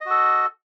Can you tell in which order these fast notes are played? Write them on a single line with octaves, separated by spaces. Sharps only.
D#5 F#4 A4